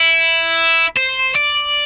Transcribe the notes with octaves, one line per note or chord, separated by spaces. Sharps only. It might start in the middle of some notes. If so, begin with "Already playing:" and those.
Already playing: E4
C5
D5